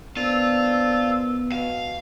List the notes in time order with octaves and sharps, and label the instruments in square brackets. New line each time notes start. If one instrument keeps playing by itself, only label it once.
[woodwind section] A#3 C5 E6 [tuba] B3 [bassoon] D4 [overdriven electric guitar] F4
[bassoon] B2 [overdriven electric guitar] F5